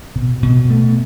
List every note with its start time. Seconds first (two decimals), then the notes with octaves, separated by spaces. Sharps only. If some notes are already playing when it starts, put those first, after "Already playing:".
0.16 B2
0.43 B2
0.70 A3